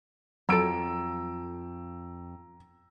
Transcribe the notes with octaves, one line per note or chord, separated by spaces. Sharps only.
F2 F#3 A4 A#5 E6 D7